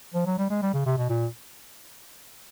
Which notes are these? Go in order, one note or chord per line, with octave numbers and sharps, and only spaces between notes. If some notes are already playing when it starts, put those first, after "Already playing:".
F3
F#3
G3
G#3
G3
C#3
C3
B2
A#2